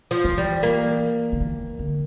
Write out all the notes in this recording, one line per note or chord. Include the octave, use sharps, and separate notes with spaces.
F3
E3
G3
A#3
D3
E3
D3